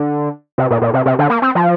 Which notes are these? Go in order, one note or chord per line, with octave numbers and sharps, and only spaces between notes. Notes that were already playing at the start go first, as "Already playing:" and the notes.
Already playing: D3
C3
A#2
A#2
C3
C3
D3
A#3
C4
F3